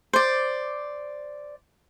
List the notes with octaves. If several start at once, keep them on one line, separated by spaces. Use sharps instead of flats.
C5 D5